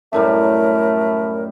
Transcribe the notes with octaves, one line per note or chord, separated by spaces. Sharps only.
F#2 A2 G3 A3 A#4